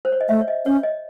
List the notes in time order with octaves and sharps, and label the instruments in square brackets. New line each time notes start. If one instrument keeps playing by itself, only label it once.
[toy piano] C5
C#5
D#5
[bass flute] A3 [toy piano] E5
[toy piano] C#5
D#5
[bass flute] C#4 [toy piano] C#5
[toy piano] D#5